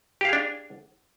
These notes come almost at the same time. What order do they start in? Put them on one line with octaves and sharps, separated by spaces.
G4 F5 G#4 D4